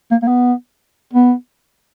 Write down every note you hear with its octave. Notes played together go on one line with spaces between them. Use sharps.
A#3
A#3
B3
B3